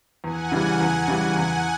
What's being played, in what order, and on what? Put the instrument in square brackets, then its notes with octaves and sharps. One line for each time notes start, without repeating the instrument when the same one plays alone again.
[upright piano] E2 [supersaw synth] F#5 G#5
[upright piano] C#3 E3 G3
E2
C#3 E3 G3
[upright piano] E2 [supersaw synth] F#5 G#5